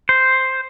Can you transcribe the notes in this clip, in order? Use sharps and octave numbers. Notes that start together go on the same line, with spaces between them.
C5